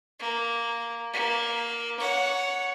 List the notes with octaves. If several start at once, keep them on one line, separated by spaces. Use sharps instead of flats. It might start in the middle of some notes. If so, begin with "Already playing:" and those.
A#3
A#3
C#5 F#5